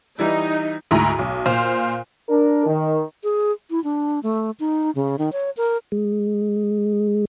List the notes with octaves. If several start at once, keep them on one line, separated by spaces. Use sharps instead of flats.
E3 G3 D#4 E4
D2 G#2 E4 A#5
B1
A#2 C5 F5
D4 A#4
D#3
G#4
E4
D4
A3
D#4
C#3
D#3
C#5
A#4
G#3